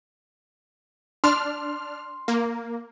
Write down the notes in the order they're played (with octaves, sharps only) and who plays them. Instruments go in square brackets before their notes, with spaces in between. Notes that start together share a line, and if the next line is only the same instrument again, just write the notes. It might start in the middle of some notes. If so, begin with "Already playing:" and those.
[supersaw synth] D4 F6 [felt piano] C6
[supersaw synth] A#3